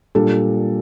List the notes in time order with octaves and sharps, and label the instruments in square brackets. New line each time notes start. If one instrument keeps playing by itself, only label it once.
[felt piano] A#2 G3 D4 A4